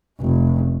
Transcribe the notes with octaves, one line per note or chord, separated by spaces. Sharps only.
F1